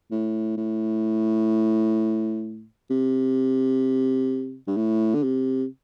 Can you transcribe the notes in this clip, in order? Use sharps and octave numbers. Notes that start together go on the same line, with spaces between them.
A2
A2
C3
G2
A2
D3
C3